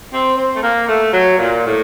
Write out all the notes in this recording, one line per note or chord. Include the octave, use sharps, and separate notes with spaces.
C4
C4
A3
A#3
A3
F#3
A#2
A2